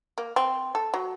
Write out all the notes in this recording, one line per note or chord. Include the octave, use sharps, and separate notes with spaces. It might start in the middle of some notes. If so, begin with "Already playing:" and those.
A#3
C4
A4
F#3